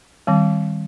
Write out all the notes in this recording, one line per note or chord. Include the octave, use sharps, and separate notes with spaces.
D#3 G3 C4